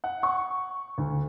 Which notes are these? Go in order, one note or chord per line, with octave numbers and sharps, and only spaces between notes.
F#5
C#6
D2